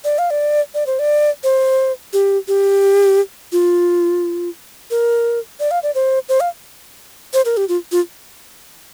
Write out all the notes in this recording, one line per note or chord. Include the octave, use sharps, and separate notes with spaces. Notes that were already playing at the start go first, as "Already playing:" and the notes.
D5
F5
D5
D5
C5
D5
C5
G4
G4
F4
A#4
D5
F5
D5
C5
C5
F5
C5
A#4
G4
F4
F4